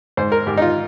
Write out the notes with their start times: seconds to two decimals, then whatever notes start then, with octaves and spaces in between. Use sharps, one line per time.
0.17 G#2 C5
0.32 A#4
0.47 G#2 G4
0.57 D#4
0.62 F4